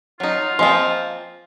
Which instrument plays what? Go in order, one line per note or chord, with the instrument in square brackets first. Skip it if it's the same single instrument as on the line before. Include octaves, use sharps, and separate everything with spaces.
[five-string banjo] F#3 D#4 [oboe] F4
[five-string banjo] F3 A#3 C4 [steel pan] D#5 G#5 C6